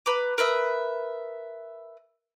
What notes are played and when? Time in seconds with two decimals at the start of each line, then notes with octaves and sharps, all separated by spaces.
0.06 B4 A#5 D6
0.38 A#4 B4 E5 D#6